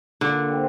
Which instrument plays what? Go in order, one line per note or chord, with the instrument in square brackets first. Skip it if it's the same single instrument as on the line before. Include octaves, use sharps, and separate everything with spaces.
[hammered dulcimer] A#2 [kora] D3
[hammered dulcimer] G3 C4